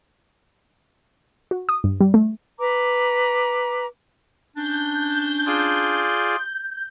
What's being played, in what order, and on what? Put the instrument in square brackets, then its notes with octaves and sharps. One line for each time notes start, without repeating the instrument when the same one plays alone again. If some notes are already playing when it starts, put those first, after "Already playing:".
[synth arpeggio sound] F#4
D#6
G2
G3
A3
[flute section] B4 A#5 D6
[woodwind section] C#4 D4 [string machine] G6
[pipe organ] F4 G#4 D5